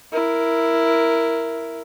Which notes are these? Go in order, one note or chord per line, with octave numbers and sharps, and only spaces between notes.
E4 A#4